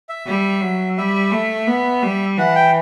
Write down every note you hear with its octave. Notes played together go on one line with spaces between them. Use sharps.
E5
G3
F#3
G3 E5
A3
B3
G3
E3 F#5
G5